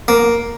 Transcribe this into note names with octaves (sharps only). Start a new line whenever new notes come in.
A#3